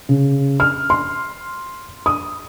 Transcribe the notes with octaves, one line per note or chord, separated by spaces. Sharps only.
C#3
F6
C6
D#6